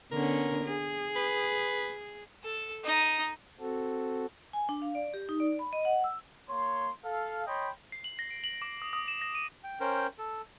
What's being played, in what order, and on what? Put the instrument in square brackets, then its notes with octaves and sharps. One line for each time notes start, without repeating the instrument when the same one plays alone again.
[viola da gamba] D3 B3 C#4 [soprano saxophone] A#4
[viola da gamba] G#4
[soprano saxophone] B4
[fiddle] A4
D#4 D#5
[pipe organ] C4 F#4 A4
[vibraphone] G#5
D4
F5
D5
G4
D#4
D5
B5
D#5
F#5
E6
[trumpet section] A#3 C#5 C6
A4 F5
C#5 D#5 G5 B5 C6
[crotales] C7
F#7
A#6
D7
F#7
D6
D#6
D#6
E7
A#6
D#7
[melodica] G5
C#4 A#4 C5 G5
A4